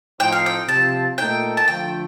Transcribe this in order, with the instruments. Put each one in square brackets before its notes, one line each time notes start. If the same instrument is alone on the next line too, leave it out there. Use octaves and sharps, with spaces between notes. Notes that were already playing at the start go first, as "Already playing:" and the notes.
[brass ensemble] A2 F3 C4 D#4 [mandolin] G5
[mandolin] F5
G5
[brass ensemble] C3 F3 C4 [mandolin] A5
[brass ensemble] A#2 A3 D#4 A4 [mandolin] G5
[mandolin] A5
[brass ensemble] D3 F3 A3 [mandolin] G5